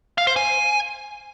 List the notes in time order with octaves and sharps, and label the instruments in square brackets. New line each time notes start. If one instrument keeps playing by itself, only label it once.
[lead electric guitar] F5
C5
G#5